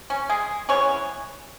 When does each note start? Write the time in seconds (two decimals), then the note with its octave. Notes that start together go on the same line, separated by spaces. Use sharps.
0.10 C#4
0.29 G#3 G#4
0.69 E3 G#3 B3 C#4 C#5